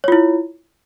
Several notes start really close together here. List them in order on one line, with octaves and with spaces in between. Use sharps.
C#5 F4 E4